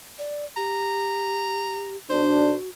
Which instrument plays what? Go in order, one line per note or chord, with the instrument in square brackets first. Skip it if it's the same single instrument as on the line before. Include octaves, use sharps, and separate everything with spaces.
[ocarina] D5
[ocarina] G4 [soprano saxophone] A#5
[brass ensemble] B1 D4 [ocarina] F#4 [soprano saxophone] C5